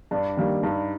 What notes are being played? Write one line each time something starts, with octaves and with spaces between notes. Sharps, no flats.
G2 D4
D#3 G3 A#3
G2 D#4